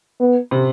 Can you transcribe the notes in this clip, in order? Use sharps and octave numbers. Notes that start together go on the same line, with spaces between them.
B3
C3